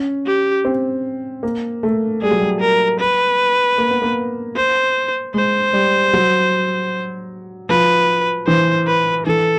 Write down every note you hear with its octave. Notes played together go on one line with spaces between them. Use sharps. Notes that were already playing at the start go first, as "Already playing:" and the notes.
Already playing: C#4
G4
C4
A#3
A3
G3 G#4
F#3
G3
A#4
B4
A#3
B3
A#3
C5
G#3 C5
G3
F#3
F3 B4
E3 C5
B4
E3 A4